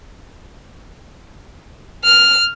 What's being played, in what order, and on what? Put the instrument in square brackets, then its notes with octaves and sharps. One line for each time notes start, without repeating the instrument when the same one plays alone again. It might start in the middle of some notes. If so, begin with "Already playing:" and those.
[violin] F6